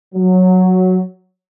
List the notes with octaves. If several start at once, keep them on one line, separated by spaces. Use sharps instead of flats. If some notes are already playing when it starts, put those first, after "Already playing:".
F#3